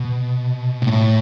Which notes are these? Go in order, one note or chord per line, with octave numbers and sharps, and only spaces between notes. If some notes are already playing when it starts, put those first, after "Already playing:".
Already playing: B2
A2